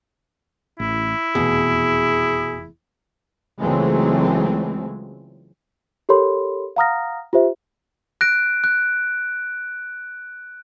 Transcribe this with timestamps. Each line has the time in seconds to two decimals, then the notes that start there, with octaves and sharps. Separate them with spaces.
0.80 A1 E4
1.35 F1 E2 B2 G#4
3.59 C#2 E3 F#3 G#3 A3 C4
6.09 G4 A4 A#4 C#5 B5 C6
6.76 F5 F#5 A#5 D#6 F6 A#6
7.33 F4 G4 C5 E5
8.21 F#6 A#6 D7
8.64 F#6